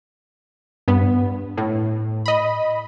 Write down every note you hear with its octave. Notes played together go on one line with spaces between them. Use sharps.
G2 B3
A2
D#5 B5